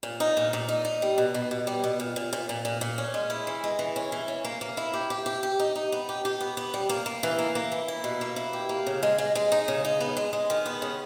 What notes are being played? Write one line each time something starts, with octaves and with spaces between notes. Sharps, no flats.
A#2
D#4
A#2
A#2
D#4
D#4
G3
B2
B2
B2
G3
B2
A#2
A#2
A#2
A#2
A#2
A#2
C#4
G#3
E4
E3
G#3
E3
C#4
E3
C#4
A#3
A#3
E4
G4
G4
G4
G4
D#4
D#4
B3
G4
G4
B3
B3
G3
A#3
A#3
E3
A#3
A#3
E3
E4
B2
A#3
E4
G4
A#3
C#3
G#3
G#3
G#3
D#4
C#3
D#4
B3
G#3
G#3
D#3
B3
C#3